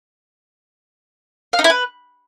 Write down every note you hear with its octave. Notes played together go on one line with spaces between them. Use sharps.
F5
D#4
E4
B4